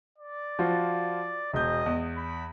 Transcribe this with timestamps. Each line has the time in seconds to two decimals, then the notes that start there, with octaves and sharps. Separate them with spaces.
0.18 D5
0.59 F3 F4 F#4
1.53 E1 D#5 G6
1.86 E2
2.18 B5